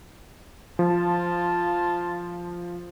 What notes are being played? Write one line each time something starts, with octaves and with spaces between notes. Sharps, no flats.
F3 F4 A5